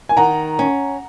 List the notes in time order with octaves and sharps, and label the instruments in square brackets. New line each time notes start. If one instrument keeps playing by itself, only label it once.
[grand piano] G#5
[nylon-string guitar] D#3 [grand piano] F#5 A#5
[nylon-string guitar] C#4